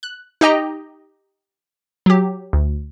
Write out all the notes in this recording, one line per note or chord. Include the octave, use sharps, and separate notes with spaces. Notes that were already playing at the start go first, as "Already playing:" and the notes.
F#6
D#4 G4 D#5 G5 A#5
F#3 G4
D2